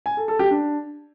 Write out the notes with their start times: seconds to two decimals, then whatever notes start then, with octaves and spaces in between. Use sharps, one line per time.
0.06 G#5
0.17 A4
0.28 A4
0.39 G4
0.51 D4